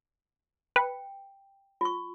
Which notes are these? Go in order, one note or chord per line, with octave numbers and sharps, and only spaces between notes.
B4 G5
F4 C#6